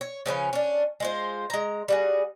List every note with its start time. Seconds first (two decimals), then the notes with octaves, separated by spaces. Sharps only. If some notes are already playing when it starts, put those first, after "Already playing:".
0.01 C#5
0.26 C#3 F3 C#4 B4
0.53 C#4 D4
1.00 G#3 F4 C5
1.50 G#3 A#5
1.88 G3 F#4 G#4